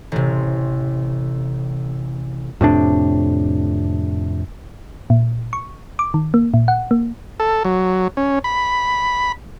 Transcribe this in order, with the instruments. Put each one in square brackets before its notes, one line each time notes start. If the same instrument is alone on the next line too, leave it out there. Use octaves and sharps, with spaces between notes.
[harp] A1 C3
[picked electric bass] F2 A2 C3 D4
[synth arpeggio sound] A#2
C#6
D6
D#3
A#3
A#2
F#5
A#3
[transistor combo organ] A4
F#3
C#4
B5